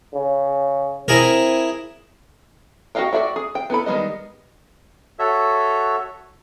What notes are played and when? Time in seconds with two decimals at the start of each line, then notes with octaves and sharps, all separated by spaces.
0.13 C#3
1.08 C4 E4 G#4 A#4
2.95 F#4 G4 D#5 F5 G5
3.13 F#4 G#4 D5 E5 G5
3.36 G#4
3.55 G5
3.70 B3 E4 A4 B5
3.86 D#3 G3 G#3 B3 D#5
5.19 F#4 A4 C#5 E5